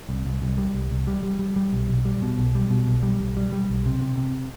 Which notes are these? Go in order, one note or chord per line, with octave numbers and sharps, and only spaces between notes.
C2
C2
C2
G3
C2
C2
G3
G3
G3
G3
B1
B1
G3
B2
B1
G3
B2
B1
G3
B1
G3
G3
B1
C3
C3
C3